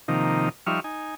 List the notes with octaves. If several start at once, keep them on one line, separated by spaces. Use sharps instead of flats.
C3 D#3 F3 A#3 D#4
F3 G3 D#4 E5 C#6 F6
D#4 G#5